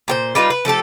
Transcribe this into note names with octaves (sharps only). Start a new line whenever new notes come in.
A#2 G4 C5
G3 D#4 F4 B4
B4
F3 A3 G4 A4